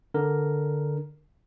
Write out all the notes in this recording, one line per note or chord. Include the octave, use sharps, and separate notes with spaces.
D3 A#4